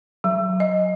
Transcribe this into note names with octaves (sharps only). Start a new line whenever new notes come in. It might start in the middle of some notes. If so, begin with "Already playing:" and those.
F#3
D#5